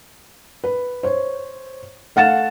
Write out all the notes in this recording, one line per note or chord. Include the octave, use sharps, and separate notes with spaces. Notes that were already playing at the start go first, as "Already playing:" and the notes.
B4
C5 C#5
A3 F5 F#5 A6 E7